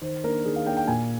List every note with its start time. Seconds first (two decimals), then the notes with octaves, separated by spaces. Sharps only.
0.01 D#3 C5
0.24 A#3 D4 A#4
0.45 D#3 G#4
0.56 F5
0.66 A#3 D4 G5
0.77 G5
0.88 A#2 G#5